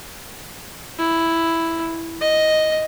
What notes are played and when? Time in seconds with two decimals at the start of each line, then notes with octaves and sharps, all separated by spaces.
0.98 E4
2.21 D#5